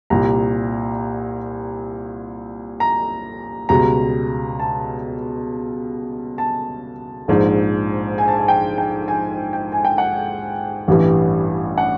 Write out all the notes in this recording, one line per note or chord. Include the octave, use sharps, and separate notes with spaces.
C2 A#2 G3 A#5
A#5
C#2 B2 G3 A#5
A5
A5
A#1 G#2 F3
G#5
A5
G#5
G5
G5
G#5
G5
G#5
G5
F#5
A1 G2 E3 G3
F#5